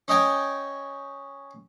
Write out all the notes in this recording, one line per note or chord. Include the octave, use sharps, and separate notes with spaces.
C#4 D#5 G5 G#5